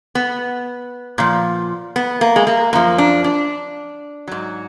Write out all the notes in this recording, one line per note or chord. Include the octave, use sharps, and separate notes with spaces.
B3
A#2 F3
B3
A#3
G#3
A#3
F#2 F3 A#3
D4
D4
G#2 F#3